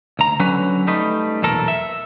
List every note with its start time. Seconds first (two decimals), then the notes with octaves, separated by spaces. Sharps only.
0.19 D2 A#5
0.40 D3 F#3 C#4 B4
0.87 G3 A3 D#4 B4
1.42 B1 E2 A#2 A4 A#4
1.68 E5